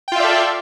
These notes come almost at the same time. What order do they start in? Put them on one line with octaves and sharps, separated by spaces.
G5 F4 E5 D5 A4